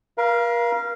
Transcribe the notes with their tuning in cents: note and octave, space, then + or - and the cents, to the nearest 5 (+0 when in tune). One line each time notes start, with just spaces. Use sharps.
A#4 +35 F5 -15